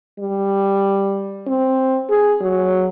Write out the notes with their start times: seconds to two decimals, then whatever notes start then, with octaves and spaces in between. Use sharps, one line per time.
0.20 G3
1.47 C4
2.09 G#4
2.41 F#3